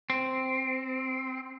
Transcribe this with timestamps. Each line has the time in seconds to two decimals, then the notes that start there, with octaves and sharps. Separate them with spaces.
0.10 C4